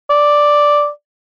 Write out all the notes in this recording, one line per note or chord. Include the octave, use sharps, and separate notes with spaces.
D5